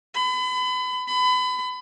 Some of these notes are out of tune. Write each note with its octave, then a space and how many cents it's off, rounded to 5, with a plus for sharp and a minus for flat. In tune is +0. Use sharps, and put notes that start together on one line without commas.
B5 +35
B5 +30